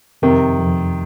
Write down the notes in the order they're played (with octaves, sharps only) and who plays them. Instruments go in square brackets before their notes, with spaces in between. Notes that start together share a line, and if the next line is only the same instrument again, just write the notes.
[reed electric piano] F2 [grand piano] C3 D#3
[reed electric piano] F2